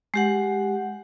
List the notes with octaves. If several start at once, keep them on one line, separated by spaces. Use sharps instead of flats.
G#3 G4 F#5